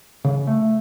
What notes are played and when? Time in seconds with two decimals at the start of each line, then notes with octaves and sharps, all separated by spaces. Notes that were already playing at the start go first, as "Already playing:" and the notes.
0.24 C#3
0.47 A3